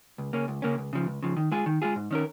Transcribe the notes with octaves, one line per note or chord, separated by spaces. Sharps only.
C#2
C#3 A#3 C#4
C#2
C#3 A#3 C#4
C#2
C#3 F3
C#2
C#3 F3
D#3
G#3 F4 G#4
D#3
G#3 F4 G#4
G#2
D#3 C#4 A#4